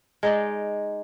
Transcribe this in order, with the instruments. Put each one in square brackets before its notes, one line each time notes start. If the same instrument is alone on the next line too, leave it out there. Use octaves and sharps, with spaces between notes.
[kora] G#3 D#4 D5